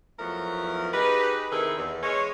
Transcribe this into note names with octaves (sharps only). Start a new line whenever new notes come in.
E2 F3 F#3 A3 A#4
D#4 G4 G#4 B4
C3 D#3 E4 G#4 A4
E2
G#3 C#5